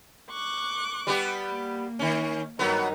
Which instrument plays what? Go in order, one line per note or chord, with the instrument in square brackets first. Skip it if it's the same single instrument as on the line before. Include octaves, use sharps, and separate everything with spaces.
[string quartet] C#6 D6 F#6
[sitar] G3 B3 G4
[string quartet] A#3
[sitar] D#3 C#4
[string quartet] G2 D#3 D#4 [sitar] F#3 B3